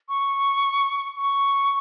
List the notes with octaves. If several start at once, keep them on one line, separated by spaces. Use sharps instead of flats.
C#6
C#6